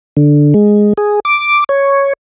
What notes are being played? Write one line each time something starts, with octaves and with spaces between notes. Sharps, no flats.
D3
G#3
G#4
D6
C#5